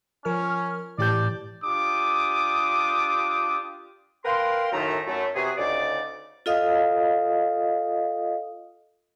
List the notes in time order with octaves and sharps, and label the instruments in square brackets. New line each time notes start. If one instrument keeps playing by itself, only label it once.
[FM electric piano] F3 A#4 F6 [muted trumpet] C#4
[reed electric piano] A2 G6 [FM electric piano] E3 G4 A5 [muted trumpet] D5
[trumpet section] D4 F4 G4 D6 D#6
[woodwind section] A#4 B4 F5 G5 C6
F#2 A2 D#3 A3 A#5
F#2 A3
C3 B3 F#4 G#4
D2 C#3 D#4 D5
[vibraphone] F4 A4 D#5 F5 D#6